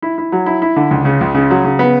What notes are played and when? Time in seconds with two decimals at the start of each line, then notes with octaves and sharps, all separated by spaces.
0.02 E4
0.18 E4
0.32 F#3
0.46 E4
0.62 E4
0.76 D3
0.91 C#2
1.05 C#3
1.21 C#2
1.35 C#3
1.50 F#3
1.64 C#3
1.79 B3